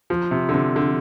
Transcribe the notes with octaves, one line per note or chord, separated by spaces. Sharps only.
F3
C3
D3
C3
D3